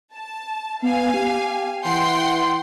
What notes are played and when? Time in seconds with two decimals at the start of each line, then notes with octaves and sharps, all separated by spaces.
0.13 A5
0.82 B3 F5 G#5
1.14 G4
1.85 E3 F#5 G5 C6